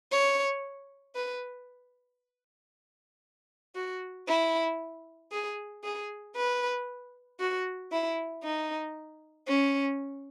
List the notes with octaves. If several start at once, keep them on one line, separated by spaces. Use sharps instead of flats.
C#5
B4
F#4
E4
G#4
G#4
B4
F#4
E4
D#4
C#4